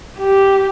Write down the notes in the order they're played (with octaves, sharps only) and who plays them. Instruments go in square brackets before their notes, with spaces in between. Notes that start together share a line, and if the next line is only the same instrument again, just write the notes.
[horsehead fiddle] G4